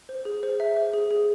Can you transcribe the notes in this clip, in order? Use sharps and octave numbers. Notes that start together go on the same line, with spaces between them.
C5
G#4
C5
E5
C5
G#4
G#4